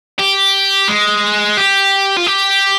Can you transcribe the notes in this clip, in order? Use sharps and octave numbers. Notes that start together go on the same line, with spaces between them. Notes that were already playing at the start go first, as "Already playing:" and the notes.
G4
G#3
G4
F4
G4